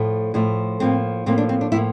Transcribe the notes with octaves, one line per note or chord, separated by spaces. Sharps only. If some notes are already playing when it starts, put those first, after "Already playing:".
Already playing: A2 F3 A3
A2 F3 A3
A2 F3 A#3 C4
A2 F3 A#3 C4
D4
C4
D4
A2 F3 A#3 E4